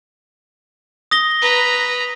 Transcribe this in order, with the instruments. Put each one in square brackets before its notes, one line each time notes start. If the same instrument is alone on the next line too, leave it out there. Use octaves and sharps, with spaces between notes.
[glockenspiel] D#6 A#6 G7
[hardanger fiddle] B4 A#5